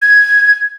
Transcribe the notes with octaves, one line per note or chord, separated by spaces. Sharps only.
G#6